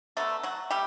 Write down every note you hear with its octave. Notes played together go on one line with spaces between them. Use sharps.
D3 F#3 A3 B3 A4
F#3 F#4
G3 A3 G4